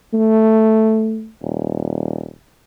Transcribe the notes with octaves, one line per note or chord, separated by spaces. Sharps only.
A3
D#1